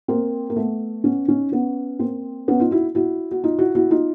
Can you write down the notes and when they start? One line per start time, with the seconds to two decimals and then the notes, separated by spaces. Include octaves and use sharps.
0.08 A#3 C4
0.50 A#3
0.56 A3 B3
1.04 B3 C#4
1.29 C#4 D#4
1.52 B3 C#4
1.99 A#3 C4
2.48 B3 C#4
2.60 D#4 F4
2.71 E4 F#4
2.95 E4 F#4
3.31 F#4
3.44 D#4 F4
3.59 E4 F#4
3.75 E4 F#4
3.91 D#4 F4